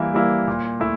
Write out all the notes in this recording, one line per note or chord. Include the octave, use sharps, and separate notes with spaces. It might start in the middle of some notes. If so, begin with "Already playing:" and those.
Already playing: E3 G3 A#3 E4
G3 A#3 E4
A#2
A3 E4